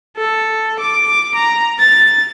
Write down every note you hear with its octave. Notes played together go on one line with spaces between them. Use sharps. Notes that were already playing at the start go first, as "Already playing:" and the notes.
A4
D6
A#5
A6